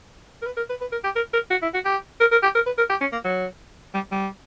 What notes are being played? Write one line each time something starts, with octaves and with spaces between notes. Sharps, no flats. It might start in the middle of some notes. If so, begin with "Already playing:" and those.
A#4
B4
A#4
B4
B4
A#4
G4
A#4
A#4
F#4
E4
F#4
G4
A#4
A#4
G4
A#4
B4
A#4
G4
C#4
A#3
F#3
G3
G3